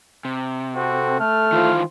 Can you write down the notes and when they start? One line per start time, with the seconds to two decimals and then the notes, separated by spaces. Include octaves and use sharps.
0.25 C3
0.76 C4 F#4 A4
1.20 A3 F6
1.52 D#3 E3 F4 C5